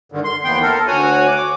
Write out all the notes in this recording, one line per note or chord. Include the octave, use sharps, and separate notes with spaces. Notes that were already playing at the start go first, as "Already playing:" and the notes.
G2 D3 D#3
C6
D#2 E3 B3 G5 C6
A4 A#4
D2 F#4 C#5 F#5 G#5
D6